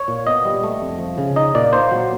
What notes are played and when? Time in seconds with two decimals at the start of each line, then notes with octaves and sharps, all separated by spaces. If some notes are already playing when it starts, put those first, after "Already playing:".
Already playing: C#5
0.08 A#2
0.27 B3 D#5
0.45 G3
0.64 A3
0.82 F2
0.99 F3
1.18 C#3
1.36 D#4 D#5
1.55 A#2 D5
1.73 A#3 C5
1.91 F#3